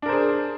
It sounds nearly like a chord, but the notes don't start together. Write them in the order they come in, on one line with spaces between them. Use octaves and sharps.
D4 A#4 C5 G#4